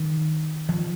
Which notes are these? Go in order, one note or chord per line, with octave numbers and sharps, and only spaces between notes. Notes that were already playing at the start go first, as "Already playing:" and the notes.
Already playing: D#3
F3